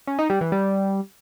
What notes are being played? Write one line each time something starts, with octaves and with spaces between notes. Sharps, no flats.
C#4
D#4
G3
E3
G3